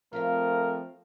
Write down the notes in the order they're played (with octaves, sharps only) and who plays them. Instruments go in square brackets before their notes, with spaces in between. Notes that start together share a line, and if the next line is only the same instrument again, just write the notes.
[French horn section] F3 A3 C4 [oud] F4 B4 F5 [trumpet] A#4